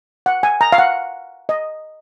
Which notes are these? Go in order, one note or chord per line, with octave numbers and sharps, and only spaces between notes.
F#5
G#5
A#5
F5
F#5
D#5